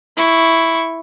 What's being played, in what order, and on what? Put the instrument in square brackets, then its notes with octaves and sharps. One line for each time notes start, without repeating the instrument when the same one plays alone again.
[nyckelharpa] E4 C#6